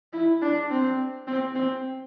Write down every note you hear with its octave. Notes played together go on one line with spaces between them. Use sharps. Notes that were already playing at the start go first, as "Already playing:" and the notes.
E4
D4
C4
C4
C4